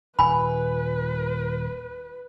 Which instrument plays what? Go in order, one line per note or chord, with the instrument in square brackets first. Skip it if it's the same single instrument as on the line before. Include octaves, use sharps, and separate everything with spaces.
[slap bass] D#1 [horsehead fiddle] B4 [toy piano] G#5 B5